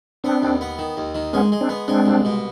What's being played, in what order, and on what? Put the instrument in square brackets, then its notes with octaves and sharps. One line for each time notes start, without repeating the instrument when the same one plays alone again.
[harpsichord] B3 [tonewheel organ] C4 D4
[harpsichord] D#2
B3
D#3
D#2
D#3
[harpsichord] G#3 [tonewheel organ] B3 C#4
[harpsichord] G#3
[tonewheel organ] C4 D4
[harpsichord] B3
[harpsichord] G#3 [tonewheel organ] C4 D4
[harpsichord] C2
B2